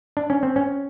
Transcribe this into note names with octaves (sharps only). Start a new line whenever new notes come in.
D4
C#4
C4
C#4